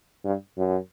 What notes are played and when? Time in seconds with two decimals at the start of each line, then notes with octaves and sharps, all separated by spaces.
0.24 G2
0.57 F#2